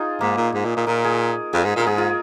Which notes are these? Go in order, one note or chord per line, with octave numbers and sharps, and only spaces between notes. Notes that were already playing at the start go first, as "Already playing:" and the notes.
Already playing: D#4 F4 G#4
G#2 A#3
A#2
G#2
A#2
A#2
A#2 A#4
G#4
F2 G#4
G#2
A#2
A#4
G#2 G#4
F4